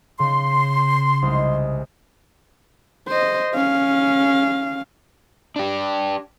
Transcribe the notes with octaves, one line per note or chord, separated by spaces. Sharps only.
C#3 C6
C2 G#3
C5 D#5
C#4 F5
D4 G4